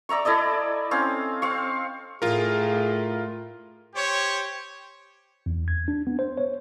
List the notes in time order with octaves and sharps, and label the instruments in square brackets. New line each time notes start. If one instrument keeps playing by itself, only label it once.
[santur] D5 E5 A#5 C#6
E4 A4 D5 D#5
C4 C#4 F5
C4 F5 C#6
[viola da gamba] A2 [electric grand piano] F4 A#4 [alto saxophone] G#4
[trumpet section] G4 C5 C#5
[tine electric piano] E2
G#6
D4
B3
C5
C#5